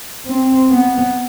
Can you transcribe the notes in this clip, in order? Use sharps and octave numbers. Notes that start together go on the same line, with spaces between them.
C4
B3